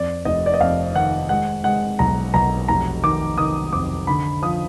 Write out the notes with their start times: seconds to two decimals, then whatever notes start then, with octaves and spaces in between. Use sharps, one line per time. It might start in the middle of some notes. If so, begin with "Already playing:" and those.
Already playing: F2 D5
0.25 F1 D#5
0.46 D5
0.54 D#5
0.60 F2 F5
0.95 D#3 F#5
1.29 G#3 F#5
1.64 G#3 F#5
1.99 B1 A#5
2.34 B1 A#5
2.68 F1 A#5
3.04 D#3 D6
3.38 D#3 D#6
3.73 F2 D6
4.07 D3 B5
4.42 F3 D#6